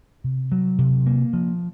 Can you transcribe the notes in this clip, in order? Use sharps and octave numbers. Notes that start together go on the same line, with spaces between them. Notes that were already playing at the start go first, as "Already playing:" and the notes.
C3
F#3
C3
A#3
F3